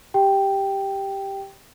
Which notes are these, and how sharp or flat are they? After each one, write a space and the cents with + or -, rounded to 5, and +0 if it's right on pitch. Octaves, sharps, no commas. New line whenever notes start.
G4 +0 G5 +0